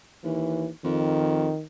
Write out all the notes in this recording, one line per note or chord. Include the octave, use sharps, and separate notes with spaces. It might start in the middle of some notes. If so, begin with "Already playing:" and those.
D#2 E3
F2 D#3